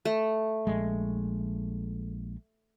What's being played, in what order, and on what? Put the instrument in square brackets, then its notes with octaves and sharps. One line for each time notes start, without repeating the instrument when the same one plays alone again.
[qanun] A3
[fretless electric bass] A#1 G#3